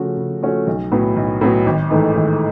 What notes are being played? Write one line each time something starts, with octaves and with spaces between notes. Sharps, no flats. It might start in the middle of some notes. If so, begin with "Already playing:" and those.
Already playing: C#3 F3 A3 C#4 F#4
C#3
F3 A3 C#4 F#4
B1
A2 F#3 B3
B1
A2 F#3 B3
G#1
G#2 E3 A3
G#1